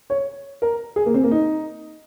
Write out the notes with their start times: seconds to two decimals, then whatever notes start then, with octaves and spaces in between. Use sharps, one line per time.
0.10 C#5
0.62 A#4
0.96 G#4
1.06 A#3
1.14 C4
1.24 A#3
1.31 D#4